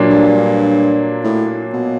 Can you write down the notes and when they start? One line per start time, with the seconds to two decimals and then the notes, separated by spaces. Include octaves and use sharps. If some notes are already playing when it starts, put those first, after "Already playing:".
Already playing: A#2 F#3 A#3 D4 F4
0.10 G2
1.24 A2
1.74 B2